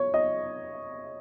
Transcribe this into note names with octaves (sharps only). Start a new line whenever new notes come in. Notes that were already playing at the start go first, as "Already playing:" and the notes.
Already playing: C#5
D#5